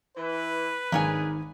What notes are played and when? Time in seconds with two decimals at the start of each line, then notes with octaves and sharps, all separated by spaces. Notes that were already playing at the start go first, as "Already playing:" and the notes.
0.17 E3 B4
0.92 G#1 G#2 A#3 D4 G#4 C#5 G#5